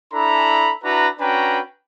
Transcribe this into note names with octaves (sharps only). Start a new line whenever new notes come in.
D4 E4 A4 A#5 B5
D4 E4 F#4 B4 A#5
C#4 D4 F#4 B4 G5 A#5